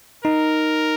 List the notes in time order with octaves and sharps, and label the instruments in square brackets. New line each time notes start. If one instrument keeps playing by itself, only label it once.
[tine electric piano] D#4 [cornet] A#4